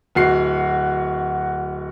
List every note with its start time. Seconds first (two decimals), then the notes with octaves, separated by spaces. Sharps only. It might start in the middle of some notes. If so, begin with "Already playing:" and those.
0.15 D1 F#4 C7